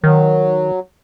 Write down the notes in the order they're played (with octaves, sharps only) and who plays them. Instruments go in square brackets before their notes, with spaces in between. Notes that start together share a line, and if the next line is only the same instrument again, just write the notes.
[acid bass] D#3 [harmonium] F#3